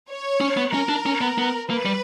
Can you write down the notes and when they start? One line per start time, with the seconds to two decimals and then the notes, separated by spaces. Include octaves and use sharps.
0.09 C#5
0.41 C#4
0.57 B3
0.73 C#4 A#4
0.89 D4
1.06 C#4
1.21 B3
1.38 B3
1.69 A#3 B4
1.85 G3